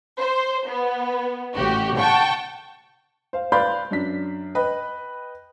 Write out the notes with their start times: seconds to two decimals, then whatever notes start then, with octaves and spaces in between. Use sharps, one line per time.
0.20 C5
0.68 B3
1.54 A1 F#4 G4
1.97 F#5 G5 A5 C#6
3.33 C5 F5
3.52 B4 D5 F5 B5 C6 G6
3.91 F#2 D4 B6
4.55 B4 D#5 G5 B5